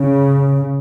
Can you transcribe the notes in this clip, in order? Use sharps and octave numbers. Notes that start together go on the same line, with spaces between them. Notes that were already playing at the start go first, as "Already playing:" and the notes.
Already playing: C#3